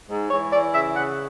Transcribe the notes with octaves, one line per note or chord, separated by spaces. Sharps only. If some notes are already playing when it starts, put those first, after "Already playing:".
G#2
E3 C#5
E3 D5
C#3 E5
C#3 F#5